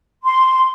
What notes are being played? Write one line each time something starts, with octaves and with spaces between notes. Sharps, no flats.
C6